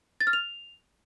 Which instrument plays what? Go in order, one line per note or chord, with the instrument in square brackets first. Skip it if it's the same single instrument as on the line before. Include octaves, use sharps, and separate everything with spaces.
[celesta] A6
F6
F7